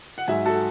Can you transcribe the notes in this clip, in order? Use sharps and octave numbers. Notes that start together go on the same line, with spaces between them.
F#5
G#2 F#3 E5 G#5
F#4 A4